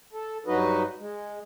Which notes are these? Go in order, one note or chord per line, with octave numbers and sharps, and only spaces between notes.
A4
G2 F#3 D#4 F#4 B4 D#5
G#3